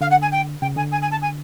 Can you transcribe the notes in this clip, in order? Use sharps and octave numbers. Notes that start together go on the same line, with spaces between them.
D3 F5
F#5
G#5
G5
C#3 G5
D3 G#5
G#5
G#5
A5
G#5